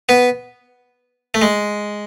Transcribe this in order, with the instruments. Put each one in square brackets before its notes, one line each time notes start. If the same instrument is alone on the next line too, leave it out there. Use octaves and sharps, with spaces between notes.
[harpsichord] B3
A3
G#3